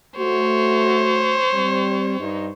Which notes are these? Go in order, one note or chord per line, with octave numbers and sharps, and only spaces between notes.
A3 F#4 C5 C#5
G3 C4
G2 D#4